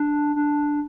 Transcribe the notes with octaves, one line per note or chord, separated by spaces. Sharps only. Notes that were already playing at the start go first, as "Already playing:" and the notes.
Already playing: D4
D4